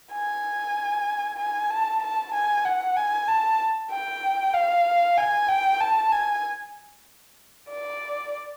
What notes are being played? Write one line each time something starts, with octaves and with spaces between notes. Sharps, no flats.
G#5
G#5
A5
A5
G#5
F#5
G#5
A5
G5
F5
G#5
G5
A5
G#5
D5